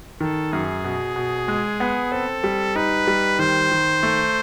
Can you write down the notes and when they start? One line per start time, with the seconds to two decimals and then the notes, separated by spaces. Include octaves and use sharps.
0.20 D#3 A4
0.52 F#2 G#4
0.84 B2
1.16 B2
1.48 G#3
1.80 B3
2.12 C4 A4
2.44 G3
2.76 D#4 B4
3.07 G3
3.39 D#3 C5
3.71 D#3
4.03 A3